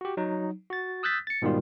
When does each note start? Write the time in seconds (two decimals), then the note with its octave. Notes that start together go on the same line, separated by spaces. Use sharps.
0.01 F#4 G4
0.17 F#3 D#4
0.70 F#4 A6
1.03 D#6 E6 F#6 G6 A6 B6
1.27 A6 C#7
1.42 G#2 B2 D#3 G3 F4